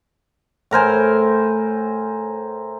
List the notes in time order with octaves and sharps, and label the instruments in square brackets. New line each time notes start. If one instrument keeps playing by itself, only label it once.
[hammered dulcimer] A2 A#4 C5 G#5